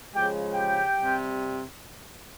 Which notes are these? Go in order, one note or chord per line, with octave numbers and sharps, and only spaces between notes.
C#3 F3 G#3 G4 G5
G4 G5
C3 G3